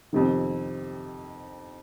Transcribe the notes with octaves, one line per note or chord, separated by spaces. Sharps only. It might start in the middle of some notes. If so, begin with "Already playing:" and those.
F2 C3 D#3